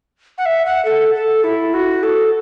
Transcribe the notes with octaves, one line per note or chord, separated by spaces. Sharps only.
F#5
E5
F#5
A4
A4
E4
F#4
A4